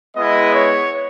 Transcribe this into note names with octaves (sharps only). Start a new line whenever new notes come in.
G#3 B3 E4 D#5
C#5